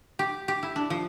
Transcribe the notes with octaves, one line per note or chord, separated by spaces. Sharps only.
G4
G4
E4
D4
F3